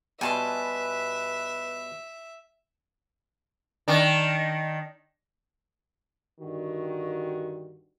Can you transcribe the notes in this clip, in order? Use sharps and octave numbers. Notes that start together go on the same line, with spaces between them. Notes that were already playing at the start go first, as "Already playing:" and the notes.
B2 G3 B4 E5 G#5 A5 C6
D#3 D4
G2 D3 D#3 F#4